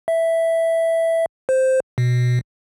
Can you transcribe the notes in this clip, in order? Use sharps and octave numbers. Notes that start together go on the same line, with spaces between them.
E5
C5
B2